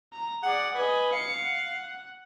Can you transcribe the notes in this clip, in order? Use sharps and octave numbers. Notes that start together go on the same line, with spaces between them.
A#5
G#4 D5 F#5
B4 D#5 G#5
F5 C#7
F#5